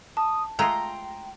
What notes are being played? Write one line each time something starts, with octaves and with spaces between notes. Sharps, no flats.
A5 D#6
G#3 A3 F4 G5 A#5 C6